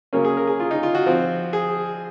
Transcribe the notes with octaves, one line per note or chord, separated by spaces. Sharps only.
C#3 F#3 A#3 C#4 A#4
G#4
A#4
G#4
F4
D#4
F4
F#4
F3 C4
G#4